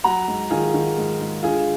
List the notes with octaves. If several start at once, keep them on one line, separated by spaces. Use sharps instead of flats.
F#3 F#5 A#5
G#2
D#3 F4 G#4
D#3
G#2
G#2
D3 F4 G#4